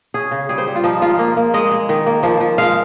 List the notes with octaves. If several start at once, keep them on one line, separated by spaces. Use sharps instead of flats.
C#4 G#4
C#3
G3 G#4
C5
G3
F4
F3 D#4
G#3 F4
A#3
A#3
G#3 D#5
G#3
D#3
A#3
F3
F3
G#3 F5